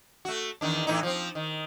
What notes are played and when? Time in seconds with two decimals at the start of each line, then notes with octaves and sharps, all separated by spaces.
0.25 A3 F#4
0.61 E2 D#3 D4
0.87 A2 E3 D#4
1.03 F3 C4
1.35 D#3